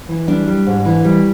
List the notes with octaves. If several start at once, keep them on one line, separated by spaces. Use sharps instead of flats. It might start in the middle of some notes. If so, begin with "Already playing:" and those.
E3
G3 D4
G3
G#2
E3
G3